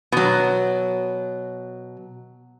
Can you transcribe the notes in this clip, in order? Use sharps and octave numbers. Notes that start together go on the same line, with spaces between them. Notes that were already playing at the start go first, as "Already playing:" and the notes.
B2 F#3